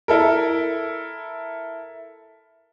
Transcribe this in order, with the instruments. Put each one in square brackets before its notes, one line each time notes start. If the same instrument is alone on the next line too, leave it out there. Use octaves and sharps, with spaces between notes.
[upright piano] E4 A4 A#4